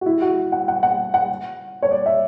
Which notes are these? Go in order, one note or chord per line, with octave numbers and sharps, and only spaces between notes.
F#4
E4
F#4
F#5
F#5
F#5
F#5
C#5
D5
E5